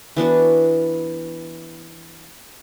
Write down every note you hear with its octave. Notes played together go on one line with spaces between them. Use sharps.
E3 B3 D4 F#4